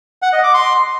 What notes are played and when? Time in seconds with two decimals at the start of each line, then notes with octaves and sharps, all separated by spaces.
0.22 F#5
0.33 D#5
0.43 D6
0.54 C6